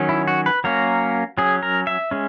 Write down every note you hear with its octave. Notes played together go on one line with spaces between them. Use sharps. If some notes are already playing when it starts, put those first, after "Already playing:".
Already playing: D#3 F#3 C#4
E4
F#4
B4
F#3 A#3 C#4 A#4
F#3 C#4 G#4
A#4
E5
G#3 C#4